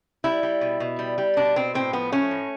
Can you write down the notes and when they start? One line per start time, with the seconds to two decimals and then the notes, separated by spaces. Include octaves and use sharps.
0.24 G3 E4
0.43 G3
0.61 B2
0.80 B2
0.99 G3
1.18 G3
1.36 B2 D4
1.56 B2 C4
1.75 A2 C4
1.93 F3 B3
2.12 A3 C#4
2.31 A2